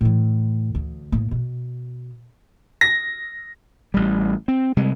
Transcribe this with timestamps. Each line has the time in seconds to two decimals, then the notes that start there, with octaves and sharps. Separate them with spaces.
0.01 A2 E3
0.75 D2
1.12 A2 A#3
1.31 B2
2.81 A#6
3.94 A1 G3
4.48 C4
4.77 C3 G3 G#3